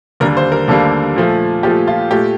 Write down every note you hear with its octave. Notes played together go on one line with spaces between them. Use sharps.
D#2 D3 G3 A#3 A#4
C5
A#4
D#2 D3 G3 A#3 A4
A#2 F3 A3
A#2 F3 A3 G4
F4
A#2 A3 G4